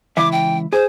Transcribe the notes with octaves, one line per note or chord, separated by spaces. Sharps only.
C#2 E3 E5 D6
G5
G#4 C5